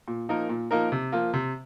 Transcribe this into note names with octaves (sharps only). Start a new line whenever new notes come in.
A#2
F3 A#3 D#4 A#4
A#2
F3 A#3 D#4 A#4
C3
F3 A#3 F4
C3